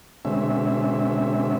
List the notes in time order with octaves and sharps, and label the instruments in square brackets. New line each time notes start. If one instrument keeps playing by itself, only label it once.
[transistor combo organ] B2 D3 G#3 C4 C#4 E5